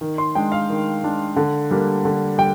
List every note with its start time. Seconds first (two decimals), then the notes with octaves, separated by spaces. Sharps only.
0.01 D#3
0.18 C6
0.35 G#3 D4 G5
0.52 F5
0.69 D#3
1.04 G#3 D4
1.37 D3
1.71 G3 A#3 D4
2.05 D3
2.38 G3 G5